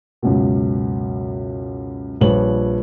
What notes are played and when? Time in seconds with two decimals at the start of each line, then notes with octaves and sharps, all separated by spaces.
0.23 C#2 F#2 B2
2.21 A#1 F3 G3 B4 C#5 F#7